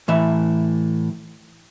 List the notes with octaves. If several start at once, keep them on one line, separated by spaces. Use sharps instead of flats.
A2 E3 E5